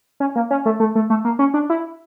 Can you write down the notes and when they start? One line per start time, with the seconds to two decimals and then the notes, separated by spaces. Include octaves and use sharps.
0.20 C#4
0.36 A#3
0.51 C#4
0.66 A3
0.80 A3
0.95 A3
1.10 A3
1.25 A#3
1.39 C#4
1.54 D4
1.70 E4